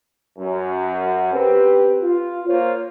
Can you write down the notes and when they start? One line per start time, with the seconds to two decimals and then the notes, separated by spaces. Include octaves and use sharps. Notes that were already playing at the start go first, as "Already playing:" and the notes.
0.38 F#2
1.32 C4 G4 B4
2.02 F4
2.47 A#3 F4 C5 C#5